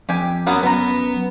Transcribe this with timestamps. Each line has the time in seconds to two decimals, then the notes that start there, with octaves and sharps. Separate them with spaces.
0.09 F2 G4 G#5
0.47 F#2 F#3 B3 C#4
0.63 F#2 B3 B4 A#5